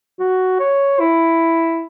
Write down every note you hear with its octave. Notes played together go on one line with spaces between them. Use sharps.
F#4
C#5
E4